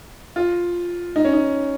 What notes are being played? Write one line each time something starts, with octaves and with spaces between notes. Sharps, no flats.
F4
D#4
C#4
D#4